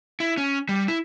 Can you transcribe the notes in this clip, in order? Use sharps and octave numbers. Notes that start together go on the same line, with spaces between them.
E4
C#4
G3
E4